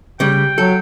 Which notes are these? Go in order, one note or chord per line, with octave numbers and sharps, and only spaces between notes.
C#3 G3 G5
F#3 A4